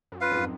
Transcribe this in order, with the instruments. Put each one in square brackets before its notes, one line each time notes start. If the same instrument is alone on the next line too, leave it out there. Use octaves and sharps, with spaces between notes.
[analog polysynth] F#2
[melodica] F4 B4 F5
[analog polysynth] F2 G#2